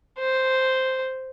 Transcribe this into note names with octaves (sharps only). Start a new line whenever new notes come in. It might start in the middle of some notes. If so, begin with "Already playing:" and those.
C5